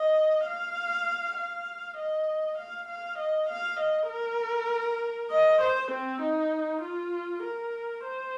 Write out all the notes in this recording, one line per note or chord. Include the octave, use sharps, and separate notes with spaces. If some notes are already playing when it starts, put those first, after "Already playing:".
Already playing: D#5
F5
F5
D#5
F5
F5
D#5
F5
D#5
A#4
D#5
C5
C4
D#4
F4
A#4
C5